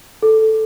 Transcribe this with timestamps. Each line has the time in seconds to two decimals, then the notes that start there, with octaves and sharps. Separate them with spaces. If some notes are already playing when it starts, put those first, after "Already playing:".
0.22 A4